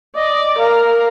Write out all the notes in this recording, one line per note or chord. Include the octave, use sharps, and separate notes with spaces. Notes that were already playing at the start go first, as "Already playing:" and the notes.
D5 D#5
A#4 F5